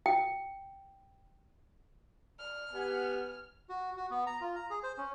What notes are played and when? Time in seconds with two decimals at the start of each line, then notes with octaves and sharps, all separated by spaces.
0.06 G5
2.40 D5 F6
2.73 G#2 B3 G4 F#5 G#5
3.69 F#4
3.97 F#4
4.11 B3
4.26 A#5
4.41 F4
4.56 A#5
4.70 G#4
4.83 C5
4.98 C#4